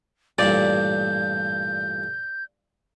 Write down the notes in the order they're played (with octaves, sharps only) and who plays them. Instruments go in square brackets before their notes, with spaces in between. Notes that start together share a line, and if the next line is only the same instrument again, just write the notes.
[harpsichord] A1 G2 A#2 [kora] D5 [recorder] G6